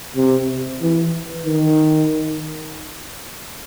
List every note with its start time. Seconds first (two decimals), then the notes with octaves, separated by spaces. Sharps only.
0.16 C3
0.81 E3
1.46 D#3